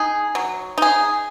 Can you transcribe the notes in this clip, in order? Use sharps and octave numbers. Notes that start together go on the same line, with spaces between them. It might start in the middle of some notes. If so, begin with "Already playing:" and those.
Already playing: D#4 G#4
F#3
D#4 G#4